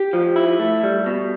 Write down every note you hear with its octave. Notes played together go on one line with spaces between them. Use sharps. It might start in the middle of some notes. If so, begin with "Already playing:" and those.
Already playing: G4
F3
E4
A3
G3
B2